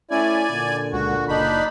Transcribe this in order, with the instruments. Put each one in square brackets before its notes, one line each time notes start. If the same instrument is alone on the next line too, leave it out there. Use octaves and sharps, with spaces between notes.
[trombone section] A3 C#4 E4 [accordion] D5 G#5
[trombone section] A#2 D3
[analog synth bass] C#2 [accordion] F#4
[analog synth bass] F#1 [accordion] D4 D#4 B5